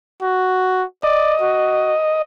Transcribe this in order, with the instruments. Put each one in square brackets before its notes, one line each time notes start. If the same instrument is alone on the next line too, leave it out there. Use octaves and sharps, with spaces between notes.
[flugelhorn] F#4
[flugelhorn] D5 [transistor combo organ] D#5
[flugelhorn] F#4